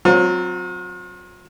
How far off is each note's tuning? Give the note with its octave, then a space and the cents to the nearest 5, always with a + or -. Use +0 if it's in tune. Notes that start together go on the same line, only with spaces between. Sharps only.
F#3 +0 C4 +0 F4 +45